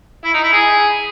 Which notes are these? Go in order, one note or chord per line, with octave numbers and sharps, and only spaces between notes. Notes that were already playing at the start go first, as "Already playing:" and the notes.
E4
D#4
E4
G#4